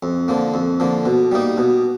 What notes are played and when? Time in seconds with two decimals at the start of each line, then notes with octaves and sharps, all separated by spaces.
0.03 F2
0.28 D3 F3 A#3
0.54 F2
0.80 D3 F3 A#3
1.06 B2
1.32 G3 A#3 D#4
1.58 B2